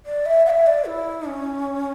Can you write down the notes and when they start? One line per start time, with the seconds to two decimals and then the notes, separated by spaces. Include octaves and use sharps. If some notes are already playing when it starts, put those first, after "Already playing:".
0.06 D5
0.26 E5
0.46 F#5
0.50 E5
0.67 D5
0.87 E4
1.27 C#4